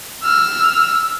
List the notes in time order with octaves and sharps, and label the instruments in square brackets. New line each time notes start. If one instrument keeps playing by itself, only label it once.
[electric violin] E6 F6